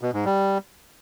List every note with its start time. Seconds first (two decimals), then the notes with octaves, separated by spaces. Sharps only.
0.01 B2
0.13 G#2
0.25 G3